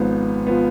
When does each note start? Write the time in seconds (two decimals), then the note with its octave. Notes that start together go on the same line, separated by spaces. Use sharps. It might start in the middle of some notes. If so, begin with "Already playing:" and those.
Already playing: G#1 G#2 F3 B3
0.47 F3 B3